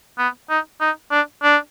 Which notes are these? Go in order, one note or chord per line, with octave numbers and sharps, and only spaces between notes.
B3
D#4
D#4
D4
D4